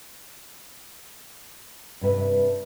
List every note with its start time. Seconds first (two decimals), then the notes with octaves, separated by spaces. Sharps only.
2.01 G2 C3 B4 E5